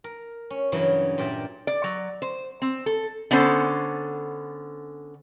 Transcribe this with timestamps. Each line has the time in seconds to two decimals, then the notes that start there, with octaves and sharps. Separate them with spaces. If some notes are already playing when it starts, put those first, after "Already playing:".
0.04 A#4
0.50 C#4
0.72 G2 C#3 E3 F#3
1.18 A#2 G4 A#4 D5 E5
1.67 D5
1.84 F#3
2.22 C5
2.62 C4
2.86 A4
3.31 D3 B3 C#4 A4 C5